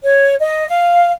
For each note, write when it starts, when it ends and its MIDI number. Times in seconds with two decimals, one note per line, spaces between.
0.04 0.36 73
0.40 0.66 75
0.69 1.11 77